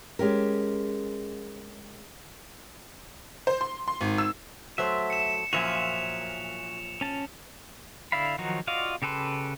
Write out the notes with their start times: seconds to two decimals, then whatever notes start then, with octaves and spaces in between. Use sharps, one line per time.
0.19 G#3 C#4 G4 A#4
3.47 C5
3.61 C6
3.88 C6
4.01 G#1
4.18 E6
4.78 F#3 A3 C5 E5
5.10 C#7 E7
5.53 F#2 A#2 F3 F#4 E5 G#5 F7
7.01 C#4 A5
8.12 D3 E4 D5 F5 B5
8.38 D#3 F3 F#3 D#4 F#4
8.67 F4 F#4 D5 D#5 F5
9.02 C#3 G4 A4 B4 C6